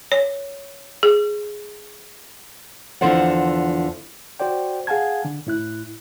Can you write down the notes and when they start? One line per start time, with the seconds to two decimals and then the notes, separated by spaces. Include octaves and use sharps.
0.12 C#5
1.03 G#4
3.01 E2 D3 F3 C5 D5 F#5
4.40 F#4 C5 D5 G5
4.87 G#4 F5 F#5 G#5 A5 G#6
5.25 D3
5.47 A2 E4 F#6